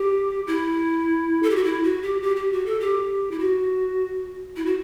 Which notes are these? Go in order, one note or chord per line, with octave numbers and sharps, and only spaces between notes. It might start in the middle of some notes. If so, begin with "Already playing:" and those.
Already playing: G4
E4
A4
G4
F#4
E4
F#4
G4
G4
G4
F#4
A4
G4
E4
F#4
E4
F#4